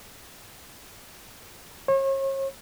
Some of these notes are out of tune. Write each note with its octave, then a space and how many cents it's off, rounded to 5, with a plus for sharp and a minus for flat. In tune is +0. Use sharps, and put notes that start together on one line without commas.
C#5 -40